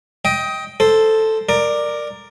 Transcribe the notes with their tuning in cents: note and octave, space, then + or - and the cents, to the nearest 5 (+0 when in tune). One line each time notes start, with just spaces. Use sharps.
D#5 +20 G5 +0
A4 +0 C5 +0
A#4 +0 D5 +15